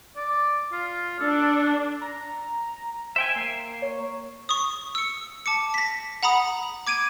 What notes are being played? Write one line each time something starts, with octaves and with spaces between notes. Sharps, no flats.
D5
F4
D4 A4
A#5
C5 E5 G5 G#5
A#3 C7
C#5
C#6 D#6
E6 C#7
A5 D6 C#7
A#6 B6
F#5 A#5 B5 D#6
D6 G#6 D7 D#7